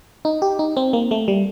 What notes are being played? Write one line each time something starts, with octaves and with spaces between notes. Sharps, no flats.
D#4
G4
D#4
C4
A#3
A3
G3